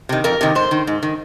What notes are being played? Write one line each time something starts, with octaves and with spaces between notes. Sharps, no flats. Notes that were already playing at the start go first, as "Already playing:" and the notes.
C3 D#3
F2 A#4
C3 D#3
G#2 C5
D#3
G#2
D#3